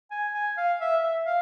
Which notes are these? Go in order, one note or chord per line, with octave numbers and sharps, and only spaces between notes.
G#5
G#5
F5
E5
E5
F5